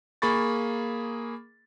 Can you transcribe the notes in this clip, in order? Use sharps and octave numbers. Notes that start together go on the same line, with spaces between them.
A#3 G#4 B5 C#6 A6